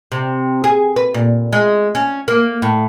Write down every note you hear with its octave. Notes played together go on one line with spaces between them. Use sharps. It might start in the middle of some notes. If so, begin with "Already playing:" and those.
C3
G#4
B4
A#2
G#3
C#4
A#3
A2